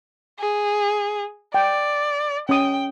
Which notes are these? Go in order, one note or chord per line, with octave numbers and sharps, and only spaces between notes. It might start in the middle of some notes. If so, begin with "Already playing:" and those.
G#4
D5 G5
C#4 G5 D#6